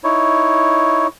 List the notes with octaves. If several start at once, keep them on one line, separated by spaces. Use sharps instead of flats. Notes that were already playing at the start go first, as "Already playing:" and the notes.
D#4 E4 C#5